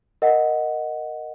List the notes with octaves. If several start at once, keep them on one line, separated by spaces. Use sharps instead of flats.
A#4 D#5 F#5